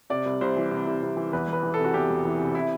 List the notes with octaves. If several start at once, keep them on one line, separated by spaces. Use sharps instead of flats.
C3 D5
C2
C2 C5
E3
C3
C2
C2
E3
E2 B4
E1
B4
E3
C3 A4
F#4
E2 G4
E1
E3
C3
C3 E4